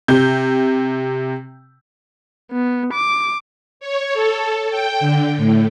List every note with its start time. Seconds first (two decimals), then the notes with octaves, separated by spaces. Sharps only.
0.08 C3 G6
2.52 B3
2.94 D6
3.80 C#5
4.13 A4
4.70 G5
5.00 D3
5.37 A2